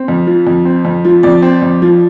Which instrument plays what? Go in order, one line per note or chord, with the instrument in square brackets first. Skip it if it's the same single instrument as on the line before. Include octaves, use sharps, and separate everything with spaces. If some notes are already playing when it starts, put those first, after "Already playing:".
Already playing: [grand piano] C4
F2
F3
F2
C4
F2
F3
F2 D5
C4
F2
F3